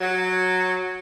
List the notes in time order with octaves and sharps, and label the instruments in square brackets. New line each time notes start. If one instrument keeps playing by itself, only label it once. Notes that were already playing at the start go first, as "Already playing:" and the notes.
[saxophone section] F#3